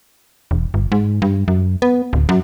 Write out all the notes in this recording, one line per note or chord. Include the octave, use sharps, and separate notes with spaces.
E1
G1
G#2
G2
F#2
B3
D1
F#2